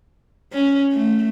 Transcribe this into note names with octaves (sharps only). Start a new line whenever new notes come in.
C#4
A3